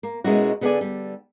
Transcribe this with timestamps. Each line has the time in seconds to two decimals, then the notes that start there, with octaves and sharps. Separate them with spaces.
0.03 A#3
0.24 B2 G#3 A#3 C#4 E4 F#4
0.61 D3 B3 G#4 C5 D5 G#5
0.81 D3 G3